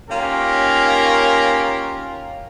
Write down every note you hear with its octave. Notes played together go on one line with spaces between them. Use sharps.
A#3 C#4 D#4 F4 G4 A#4